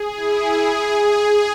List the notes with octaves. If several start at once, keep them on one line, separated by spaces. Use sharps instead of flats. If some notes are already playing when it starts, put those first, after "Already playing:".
Already playing: G#4
E4
G#4